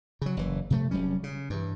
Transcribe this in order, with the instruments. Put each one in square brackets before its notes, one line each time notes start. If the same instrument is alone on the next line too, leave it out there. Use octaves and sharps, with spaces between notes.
[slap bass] C#3 F#3
F#1 E3
C3 F3 G3 A3
F1 F#3 G3 C#4
C#3
G2 E3